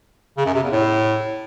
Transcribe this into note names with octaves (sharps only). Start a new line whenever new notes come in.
C#3
F#2
C3
E2
A2